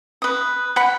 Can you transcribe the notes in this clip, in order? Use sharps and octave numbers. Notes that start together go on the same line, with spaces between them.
B4 D#6
F#5 B5